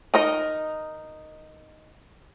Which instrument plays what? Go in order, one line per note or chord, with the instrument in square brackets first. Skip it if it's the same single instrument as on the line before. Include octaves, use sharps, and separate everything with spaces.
[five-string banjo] D#4 A#4 D#5